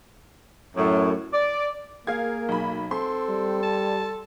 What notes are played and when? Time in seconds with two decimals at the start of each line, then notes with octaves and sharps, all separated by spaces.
0.76 F#2 A2
1.33 D5
2.07 A#3 G#4 A#4 F5 G#6
2.49 B1 B5
2.91 C4 A4 C6
3.29 G3
3.63 A5